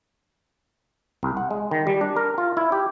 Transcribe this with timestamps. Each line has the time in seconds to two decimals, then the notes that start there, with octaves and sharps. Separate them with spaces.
1.23 C2
1.37 F#5
1.51 G#3
1.71 D#3
1.87 G3
2.01 D4
2.16 A#4
2.38 F4
2.57 E4
2.72 G4